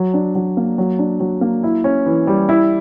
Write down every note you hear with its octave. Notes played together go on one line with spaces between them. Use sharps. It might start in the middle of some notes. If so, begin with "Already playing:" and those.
Already playing: F#3
D4
F#3
A#3
F#3
D4
F#3
A#3
E4
C#4
E3
G3
E4